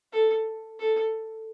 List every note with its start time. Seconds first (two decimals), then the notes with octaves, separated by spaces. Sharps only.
0.13 A4
0.79 A4